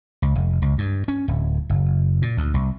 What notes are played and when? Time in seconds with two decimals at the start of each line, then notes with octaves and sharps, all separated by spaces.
0.22 C#2
0.35 F1
0.62 C#2
0.78 G2
1.08 C#4
1.28 D1
1.70 F#1
2.22 A#2
2.37 D2
2.54 C2